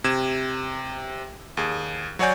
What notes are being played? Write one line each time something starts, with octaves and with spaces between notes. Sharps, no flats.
C3 G#6 E7
D#2 G#4
F#3 F#4 C#5 D5 G#5 G6